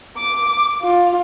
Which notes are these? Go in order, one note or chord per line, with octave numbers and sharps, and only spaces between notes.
D6
F4